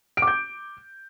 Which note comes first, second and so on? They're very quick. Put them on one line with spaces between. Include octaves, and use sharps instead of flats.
D7 D6 G6